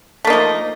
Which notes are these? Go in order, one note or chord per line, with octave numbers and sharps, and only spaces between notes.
F3 A3 A#3 D#4